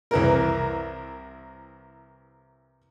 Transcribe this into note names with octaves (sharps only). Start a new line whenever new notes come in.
C2 E3 A#4